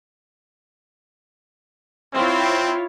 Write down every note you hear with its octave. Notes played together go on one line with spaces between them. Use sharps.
C4 E4 F4 C#5